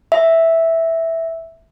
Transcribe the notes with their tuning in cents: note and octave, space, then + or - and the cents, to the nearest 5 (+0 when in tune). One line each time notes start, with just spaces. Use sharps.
E5 -5